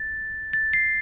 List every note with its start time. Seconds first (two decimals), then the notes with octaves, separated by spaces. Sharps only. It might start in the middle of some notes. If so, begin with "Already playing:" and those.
Already playing: A6
0.53 A6
0.73 C7